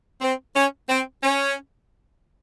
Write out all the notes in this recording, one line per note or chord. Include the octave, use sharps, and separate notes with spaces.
C4
C#4
C4
C#4